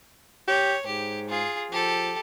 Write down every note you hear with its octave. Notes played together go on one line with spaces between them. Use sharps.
G4 C#5
G#2 G4
F4 G#4
F3 G4 A4